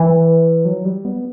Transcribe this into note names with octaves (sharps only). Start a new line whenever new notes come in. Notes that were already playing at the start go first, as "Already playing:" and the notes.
Already playing: E3
F#3
G3
B3